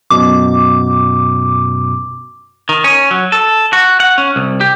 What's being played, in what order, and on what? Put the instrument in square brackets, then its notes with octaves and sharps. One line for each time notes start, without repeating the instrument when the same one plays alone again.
[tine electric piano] F#2 B2 [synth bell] D6
[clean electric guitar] D#3
C#4
F#3
A4
F#4
F#5
C#4
C2
G4